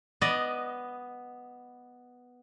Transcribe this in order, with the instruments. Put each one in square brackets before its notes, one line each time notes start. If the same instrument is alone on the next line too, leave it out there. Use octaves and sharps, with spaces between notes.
[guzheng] B3 D5 D#5